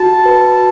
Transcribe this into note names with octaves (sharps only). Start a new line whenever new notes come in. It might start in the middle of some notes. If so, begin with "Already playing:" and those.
Already playing: F#4 A5
B4